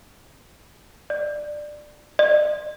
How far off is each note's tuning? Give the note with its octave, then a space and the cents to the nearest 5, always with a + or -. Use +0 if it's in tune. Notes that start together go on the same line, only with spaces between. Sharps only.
D5 +15
D5 +45